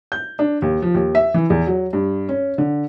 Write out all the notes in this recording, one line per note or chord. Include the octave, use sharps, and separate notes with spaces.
G6
D4
D#2
F3
D#2
E5
E3
E2
F#3
G2
C#4
D3